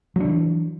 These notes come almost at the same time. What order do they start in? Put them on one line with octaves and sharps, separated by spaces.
F#3 D4 D#3 E3